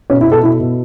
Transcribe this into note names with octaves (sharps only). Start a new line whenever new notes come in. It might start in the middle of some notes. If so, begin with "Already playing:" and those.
B2 C#4
E4
B2 A4
B2 E4
B2